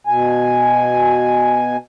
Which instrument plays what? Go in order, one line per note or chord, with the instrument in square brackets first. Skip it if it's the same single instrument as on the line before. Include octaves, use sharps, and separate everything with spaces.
[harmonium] B2 G#5